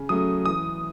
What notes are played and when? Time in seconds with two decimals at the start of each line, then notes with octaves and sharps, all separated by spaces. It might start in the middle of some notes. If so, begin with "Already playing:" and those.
Already playing: C#3
0.09 F#3 A3 C#4 D#6
0.46 E3 D#6